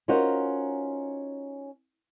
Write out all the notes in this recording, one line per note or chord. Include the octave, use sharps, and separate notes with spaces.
C#4 D#4 F4 F#4 A#4 C5